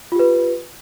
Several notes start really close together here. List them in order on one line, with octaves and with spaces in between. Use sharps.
F4 G4 B4